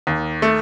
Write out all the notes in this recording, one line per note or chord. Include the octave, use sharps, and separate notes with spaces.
D#2
A3